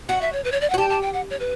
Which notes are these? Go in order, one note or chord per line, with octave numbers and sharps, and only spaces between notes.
F#4 F#5
E5
C#5
B4
C#5
D5
F#5
F#4
G4 A5
A5
G5
F#5
C#5
B4